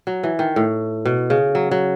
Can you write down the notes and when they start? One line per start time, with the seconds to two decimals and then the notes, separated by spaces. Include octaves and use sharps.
0.07 F#3
0.23 E3
0.39 D#3
0.56 A2
1.05 B2
1.30 C#3
1.55 F#3
1.71 F#3